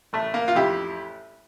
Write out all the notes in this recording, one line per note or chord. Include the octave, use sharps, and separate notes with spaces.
A1 A3
A#3
F4
F2 E4 G4